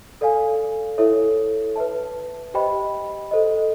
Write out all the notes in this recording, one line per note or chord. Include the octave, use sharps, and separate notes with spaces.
A4 D5 F5 G#5
E4 A4 C#5 E5
B4 E5 A5
G4 C5 D#5 G5 B5
A4 C5 D#5